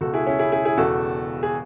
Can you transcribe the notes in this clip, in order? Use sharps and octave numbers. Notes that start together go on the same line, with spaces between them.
C#2 B2 F#4 A4
E4 G#4
C#4 E4
E4 G#4
E4 G#4
E4 G#4
E1 E2 C#3 F#4 A4
G#4